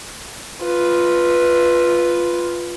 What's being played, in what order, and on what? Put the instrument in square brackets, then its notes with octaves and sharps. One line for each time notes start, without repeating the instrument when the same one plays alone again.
[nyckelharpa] F4 B4